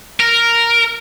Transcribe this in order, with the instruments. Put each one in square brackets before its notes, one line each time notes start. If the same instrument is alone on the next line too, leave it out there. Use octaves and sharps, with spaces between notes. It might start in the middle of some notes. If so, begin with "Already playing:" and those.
[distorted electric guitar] A#4